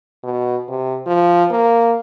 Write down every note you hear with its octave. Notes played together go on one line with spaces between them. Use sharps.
B2
C3
F3
A#3